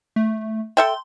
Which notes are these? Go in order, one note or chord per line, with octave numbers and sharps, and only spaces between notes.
A3
A4 E5 G5 C6